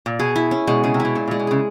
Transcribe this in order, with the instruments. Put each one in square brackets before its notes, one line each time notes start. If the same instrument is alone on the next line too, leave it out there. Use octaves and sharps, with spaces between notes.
[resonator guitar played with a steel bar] A#2
[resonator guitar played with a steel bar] B2 [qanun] G#4
[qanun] E4
C#4
[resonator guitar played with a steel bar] B2 [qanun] G#3
[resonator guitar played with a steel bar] C#3 [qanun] G#4
[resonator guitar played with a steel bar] C3
[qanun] E4
[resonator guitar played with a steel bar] B2
[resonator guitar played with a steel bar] A#2 [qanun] C#4
[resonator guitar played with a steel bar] A#2
[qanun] G#3
[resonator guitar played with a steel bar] B2
[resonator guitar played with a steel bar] C#3 [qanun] G#4